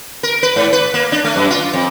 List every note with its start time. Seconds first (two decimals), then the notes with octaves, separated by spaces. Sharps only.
0.23 A#4
0.43 B4
0.56 G#2
0.73 B4
0.94 A#3
1.12 D4
1.24 A3
1.36 F#2
1.50 F4
1.73 F2